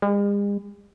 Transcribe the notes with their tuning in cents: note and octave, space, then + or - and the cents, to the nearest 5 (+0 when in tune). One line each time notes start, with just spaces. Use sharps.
G#3 -45